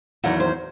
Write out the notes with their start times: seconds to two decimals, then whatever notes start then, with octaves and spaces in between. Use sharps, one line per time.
0.24 E2 D#3 F#3 F#5
0.40 C5